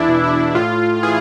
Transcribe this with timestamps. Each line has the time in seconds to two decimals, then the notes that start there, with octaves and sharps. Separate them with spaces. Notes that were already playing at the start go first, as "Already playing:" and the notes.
Already playing: E2 D4 E4
0.08 B2
0.24 E4
0.55 A2 F4
1.03 E3 G#4